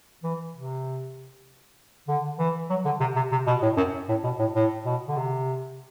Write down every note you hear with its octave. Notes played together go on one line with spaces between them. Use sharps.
E3
C3
D3
E3
F#3
D3
C3
C3
C3
B2
A2
F#2
A2
B2
A2
A2
B2
D3
C3